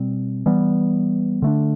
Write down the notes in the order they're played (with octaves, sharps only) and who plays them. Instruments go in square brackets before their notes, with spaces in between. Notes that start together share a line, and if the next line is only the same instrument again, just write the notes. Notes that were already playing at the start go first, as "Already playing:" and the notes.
Already playing: [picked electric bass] B2 G3 C4
E3 G3 B3
D3 A3 D4